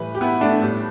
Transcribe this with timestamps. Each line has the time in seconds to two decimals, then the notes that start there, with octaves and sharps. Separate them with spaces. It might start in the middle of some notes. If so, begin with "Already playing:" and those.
Already playing: A2 E3 G3 B4
0.15 G4
0.21 B3 E4
0.41 A3 D4
0.62 A2 G3